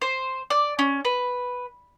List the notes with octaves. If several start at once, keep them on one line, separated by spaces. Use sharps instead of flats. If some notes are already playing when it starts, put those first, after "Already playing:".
C5
D5
C#4
B4